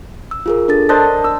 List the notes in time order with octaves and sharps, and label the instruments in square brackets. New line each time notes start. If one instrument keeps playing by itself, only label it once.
[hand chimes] E6
F4 G#4 A#4
D4 A4 A6
[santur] D4 C5 D#5 [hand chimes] A#4
[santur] E6